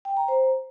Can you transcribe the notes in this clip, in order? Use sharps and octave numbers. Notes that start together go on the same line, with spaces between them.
G5
A#5
C5